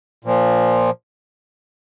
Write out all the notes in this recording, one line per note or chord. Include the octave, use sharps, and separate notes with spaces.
A#2 F3